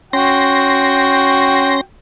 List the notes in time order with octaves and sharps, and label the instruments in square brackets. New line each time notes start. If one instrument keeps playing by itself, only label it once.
[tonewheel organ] C#4 C6 A#6 [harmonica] F#4 G5